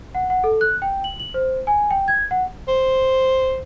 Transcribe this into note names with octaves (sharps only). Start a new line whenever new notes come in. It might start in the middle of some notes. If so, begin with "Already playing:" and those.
F#5
F#5
A4
F#6
G5
F#7
F#7
C5
G#5
G5
G#6
F#5
C5